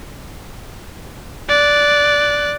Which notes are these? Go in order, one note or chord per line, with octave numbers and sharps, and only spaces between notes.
D5 F#6